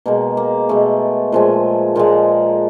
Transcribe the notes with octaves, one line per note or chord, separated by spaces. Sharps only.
B2 G#3 A#3
A#3
B2 G#3 A3
A#2 F3 G#3
A#2 F3 G#3 A#3